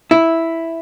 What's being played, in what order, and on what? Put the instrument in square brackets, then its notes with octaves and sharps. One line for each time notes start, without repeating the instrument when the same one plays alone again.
[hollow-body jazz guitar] E4